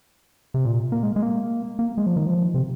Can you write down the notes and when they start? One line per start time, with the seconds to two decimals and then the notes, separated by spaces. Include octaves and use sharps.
0.54 C3
0.65 A#2
0.92 A#3
1.03 G#3
1.16 G#3
1.22 A#3
1.79 A#3
1.98 G#3
2.06 F3
2.16 D#3
2.26 F3
2.54 C3